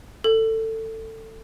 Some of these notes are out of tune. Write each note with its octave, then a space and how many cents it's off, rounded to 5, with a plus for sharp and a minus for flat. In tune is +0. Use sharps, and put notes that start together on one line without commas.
A4 +20